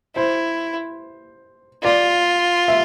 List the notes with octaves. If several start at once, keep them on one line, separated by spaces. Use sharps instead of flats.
E4 C5
F4 D5
E5